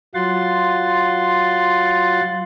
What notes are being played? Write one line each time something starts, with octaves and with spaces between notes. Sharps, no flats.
F#3 F4 F#5 C6 A6